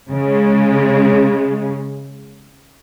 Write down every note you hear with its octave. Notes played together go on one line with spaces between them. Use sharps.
C#3 G#3